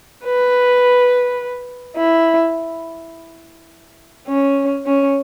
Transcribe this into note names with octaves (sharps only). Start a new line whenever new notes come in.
B4
E4
C#4
C#4